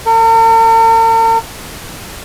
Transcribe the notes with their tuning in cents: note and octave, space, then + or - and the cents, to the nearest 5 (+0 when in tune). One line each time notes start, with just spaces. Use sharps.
A#4 -45